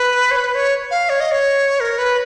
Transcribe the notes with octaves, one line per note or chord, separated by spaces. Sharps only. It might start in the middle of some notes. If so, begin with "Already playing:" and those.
Already playing: B4
C#5
B4
C#5
F5
C#5
D#5
C#5
A#4
B4